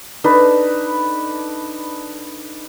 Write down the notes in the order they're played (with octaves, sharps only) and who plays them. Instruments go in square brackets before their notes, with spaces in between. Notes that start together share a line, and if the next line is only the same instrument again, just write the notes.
[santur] D4 D#4 A4 B4